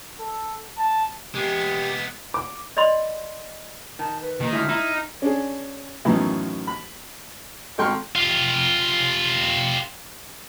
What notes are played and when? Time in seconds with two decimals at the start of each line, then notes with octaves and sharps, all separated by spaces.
0.20 A4
0.78 A5
1.35 G#3 B3 G4
2.34 D6
2.77 D5 D#5 B5 C6
3.99 D#3 A5
4.22 B4
4.40 D#2 D#3
4.53 D2 G#2 E4 F6
4.69 D#4 E4
5.22 C#4 D4 G#4
6.05 F#2 A2 D#3 E3 F#3 B3
6.67 B5
7.78 G#1 A4 G5 C6 C#6 F6
8.15 F4 G4